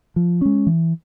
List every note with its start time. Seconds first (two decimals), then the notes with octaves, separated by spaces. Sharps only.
0.16 F3
0.41 G#3 C#4
0.67 E3